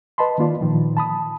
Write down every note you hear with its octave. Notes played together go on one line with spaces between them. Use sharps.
B4 D#5 A5 B5 C6
D#3 A#3 F4 D5
A#2 D#3 F3
A5 B5 D#6